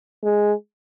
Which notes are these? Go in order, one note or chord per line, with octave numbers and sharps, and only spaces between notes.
G#3